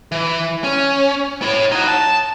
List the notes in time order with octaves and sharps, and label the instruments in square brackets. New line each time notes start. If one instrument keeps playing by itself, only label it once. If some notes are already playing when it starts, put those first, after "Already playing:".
[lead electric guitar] E3
C#4
E4 C#5
D#4 F#4
A5